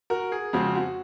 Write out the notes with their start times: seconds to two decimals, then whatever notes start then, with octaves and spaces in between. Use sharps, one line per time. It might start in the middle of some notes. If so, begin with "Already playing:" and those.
0.10 F#4 A#4
0.32 G#4
0.53 F2 C#3 G#3 C4 F#4
0.75 F#4